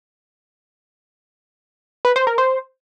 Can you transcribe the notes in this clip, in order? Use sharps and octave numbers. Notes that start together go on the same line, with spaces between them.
B4
C5
A#4
C5